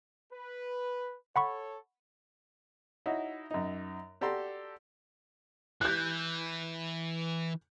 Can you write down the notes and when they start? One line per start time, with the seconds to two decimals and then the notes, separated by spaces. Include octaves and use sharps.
0.33 B4
1.36 A4 C#5 F#5 B5 C#6
3.06 D#4 E4 F#4 C#5
3.51 F#2 D#4
4.21 F#4 G4 A4 D5 A#5 C6
5.81 E3 F#6 G6